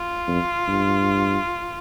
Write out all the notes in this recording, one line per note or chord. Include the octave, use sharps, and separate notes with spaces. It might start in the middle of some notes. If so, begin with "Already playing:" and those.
Already playing: F4
F2
G2